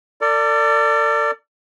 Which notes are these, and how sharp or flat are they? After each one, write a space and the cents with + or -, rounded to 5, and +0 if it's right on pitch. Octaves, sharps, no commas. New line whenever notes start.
A4 +45 D5 +0